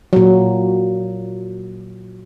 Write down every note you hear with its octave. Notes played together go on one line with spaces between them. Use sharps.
A#2 F#3